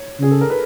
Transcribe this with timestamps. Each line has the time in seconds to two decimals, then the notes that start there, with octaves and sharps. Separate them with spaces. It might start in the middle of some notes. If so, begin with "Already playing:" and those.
Already playing: C#5
0.21 C#3 G#4
0.31 A4
0.41 A#4
0.50 B4